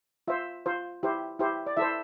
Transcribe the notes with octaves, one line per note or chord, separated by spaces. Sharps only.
F4 C5 E5
F4 C5
E4 G4 C5
E4 G4 C5
D5
E4 A4 C5 E5